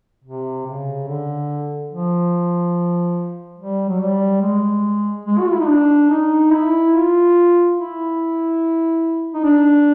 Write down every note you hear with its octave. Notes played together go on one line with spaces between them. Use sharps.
C3
C#3
D3
F3
G3
F#3
G3
G#3
G#3
F#4
F4
E4
D#4
D4
D#4
E4
F4
E4
D#4
D4